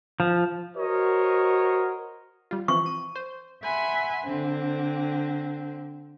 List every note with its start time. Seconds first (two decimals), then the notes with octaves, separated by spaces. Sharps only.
0.20 F3
0.77 F#4 A#4 C5 C#5 D#5
2.51 G3 F4
2.68 E3 F3 C4 C#6
2.86 D#7
3.16 C5
3.61 E5 F#5 G#5 B5 C6
4.23 D3 C4